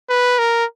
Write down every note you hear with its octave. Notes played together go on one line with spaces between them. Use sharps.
B4
A#4